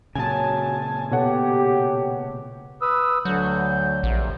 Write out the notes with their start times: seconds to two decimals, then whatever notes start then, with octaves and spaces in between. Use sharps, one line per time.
0.15 A#2 C#3 F#3 G#5 A5
1.12 B2 G4 A4 C#5 F#5
2.82 B4 D#6 E6
3.25 D2 D3 F#3 G6
4.03 A#1 C3